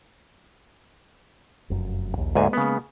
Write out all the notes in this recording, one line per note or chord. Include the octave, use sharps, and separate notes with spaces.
F1 F#2
A#1 D#2
D2 G#2 G#3 A#3 G#5
C#3 B3